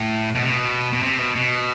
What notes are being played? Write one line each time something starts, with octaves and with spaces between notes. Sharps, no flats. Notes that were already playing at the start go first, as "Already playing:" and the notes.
Already playing: A2
B2
C3
B2
B2
C3
B2
B2